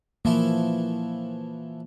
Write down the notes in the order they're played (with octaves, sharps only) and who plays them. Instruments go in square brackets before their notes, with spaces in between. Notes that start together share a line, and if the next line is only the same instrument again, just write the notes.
[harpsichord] E3 F3 E4 [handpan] A#3